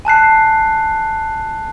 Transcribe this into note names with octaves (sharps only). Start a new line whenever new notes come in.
G#5 A5 F#6 C7